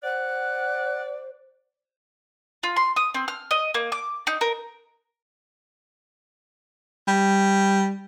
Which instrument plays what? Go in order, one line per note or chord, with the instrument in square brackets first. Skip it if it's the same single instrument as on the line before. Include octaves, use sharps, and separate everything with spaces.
[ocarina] C5 [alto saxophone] D5 [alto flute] F#5 [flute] F#6
[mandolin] F4
C6
D#6
C4
F6
D#5
A#3
D6
D#4
A#4
[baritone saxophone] G3